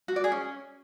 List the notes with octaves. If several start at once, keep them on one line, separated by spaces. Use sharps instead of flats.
F#4
D5
G#4
C#4